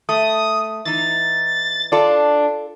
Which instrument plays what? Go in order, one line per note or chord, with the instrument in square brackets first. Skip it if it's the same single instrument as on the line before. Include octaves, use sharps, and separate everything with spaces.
[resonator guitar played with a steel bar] A3 [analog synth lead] D#6
[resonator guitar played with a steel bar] E3 D#4 [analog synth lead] A6
[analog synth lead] D4 [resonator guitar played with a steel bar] F4 A4